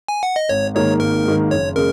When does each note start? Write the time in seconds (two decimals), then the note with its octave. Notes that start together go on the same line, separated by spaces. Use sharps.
0.08 G#5
0.23 F#5
0.36 D#5
0.49 G#1 C#5
0.75 G#2 D#3 A#3 C#5
1.00 G#1 A#4
1.25 G#2 D#3 A#3
1.51 F#1 C#5
1.76 C#3 G#3 A#4